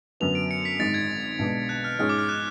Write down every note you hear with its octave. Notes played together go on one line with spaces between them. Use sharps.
F#2 D3 F#3 B3 F7
D7
C#7
B6
G#1 G#2 G#3 A6
G#6
B1 B2 G#3 D4
F#6
F6
G#2 G#3 C#4 G#4 C#5 F6
D6
F6
F#6